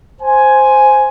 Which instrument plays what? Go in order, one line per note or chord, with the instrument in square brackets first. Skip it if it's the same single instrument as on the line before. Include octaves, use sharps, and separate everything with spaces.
[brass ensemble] C5 G#5